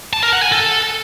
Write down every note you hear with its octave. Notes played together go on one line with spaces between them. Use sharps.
A5
A#4
F#5
G#5
A4